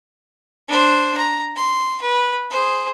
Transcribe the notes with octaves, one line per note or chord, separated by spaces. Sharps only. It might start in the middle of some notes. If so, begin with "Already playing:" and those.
D4 C5
A#5
C6
B4
G#4 C5